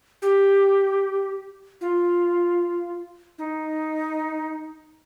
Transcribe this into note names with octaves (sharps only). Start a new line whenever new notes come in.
G4
F4
D#4